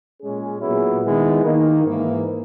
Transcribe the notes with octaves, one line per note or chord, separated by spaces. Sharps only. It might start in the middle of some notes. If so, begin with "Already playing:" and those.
A#2 G#3 C#4 G#4
A#2 F#3 B3 E4 G#4
D#3 G#3 B3 E4
D#3 A#3 D#4
G#2 E3 A#3